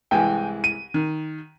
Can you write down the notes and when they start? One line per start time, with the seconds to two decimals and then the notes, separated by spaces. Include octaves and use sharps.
0.11 C2 E3 G#3 G5 G#5
0.64 D#7
0.94 D#3